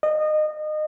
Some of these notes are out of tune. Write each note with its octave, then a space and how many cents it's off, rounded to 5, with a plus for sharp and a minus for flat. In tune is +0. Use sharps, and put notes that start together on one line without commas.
D#5 -25